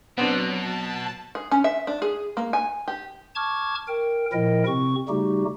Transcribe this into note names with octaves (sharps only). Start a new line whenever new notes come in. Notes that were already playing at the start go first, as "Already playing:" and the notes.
B2 F#3 B3 C4 D4
A5
G#4
C#4
E5
D4
G#4
A#3
G#5
G4
A5 C#6 D6 F6 G#6
A#4 G5
A#2 F3 E4 A#4 D#5 G5
C3 C4 C#6
C#3 G3 A3 D#4 F#4 G4